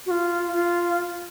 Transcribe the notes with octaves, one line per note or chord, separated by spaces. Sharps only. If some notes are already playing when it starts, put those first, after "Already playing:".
F#4
F4
F4